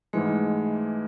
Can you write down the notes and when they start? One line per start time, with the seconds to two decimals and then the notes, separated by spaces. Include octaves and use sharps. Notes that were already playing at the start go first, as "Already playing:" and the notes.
0.13 G#2 E3 G#3 A3